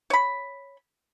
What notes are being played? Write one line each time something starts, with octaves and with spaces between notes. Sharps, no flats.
C#5 B5